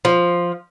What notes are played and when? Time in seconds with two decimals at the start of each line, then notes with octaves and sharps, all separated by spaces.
0.05 F3